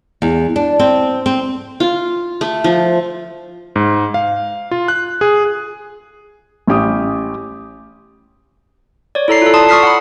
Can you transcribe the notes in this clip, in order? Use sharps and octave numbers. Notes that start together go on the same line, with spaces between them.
E2
D4
C4
C4
F4
A3
F3
G#2
F5
F4
F#6
G#4
A1 C#4 G4 D#6
C#5 D5
E4 A4 A#5 C7
F4 A4
D5 A5 C6 D#6
C#6 D#6 F6 B6 C7
F#5 B5